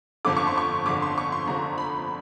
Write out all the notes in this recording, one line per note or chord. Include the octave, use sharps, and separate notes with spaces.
G1 F2 D3 D6
C#6
C6
C#6
G1 F2 D3 D6
C6
C#6
C6
G1 F2 D3 A#5
B5